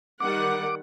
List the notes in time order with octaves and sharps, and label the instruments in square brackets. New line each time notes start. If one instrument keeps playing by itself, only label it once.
[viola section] D#3 G3 F#5 [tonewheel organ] D6